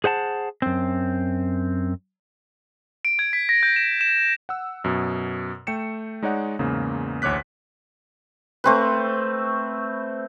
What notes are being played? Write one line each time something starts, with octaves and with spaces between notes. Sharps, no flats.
G#4 C5 F#5 A5
F#2 C4
D7
G#6
B6
A#6
G6
E7
E7
F#5 E6
F#2 B2
A3 G5 C#7 E7
G#3 D#4 C#5 D5 F#5
E2 G#2 C#3 A#3
A1 D2 C#5 D6 F#6 B6
A3 C4 B4